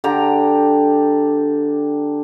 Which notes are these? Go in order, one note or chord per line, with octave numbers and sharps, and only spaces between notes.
D3 G4 A#5